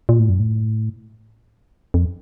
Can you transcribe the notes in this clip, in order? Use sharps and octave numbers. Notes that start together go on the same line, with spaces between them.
A#2
A2
F#2
A2
F2